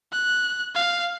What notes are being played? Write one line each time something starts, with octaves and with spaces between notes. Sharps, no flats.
F#6
F5